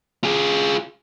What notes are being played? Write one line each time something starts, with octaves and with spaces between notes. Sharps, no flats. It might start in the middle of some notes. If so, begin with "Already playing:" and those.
F4 G#4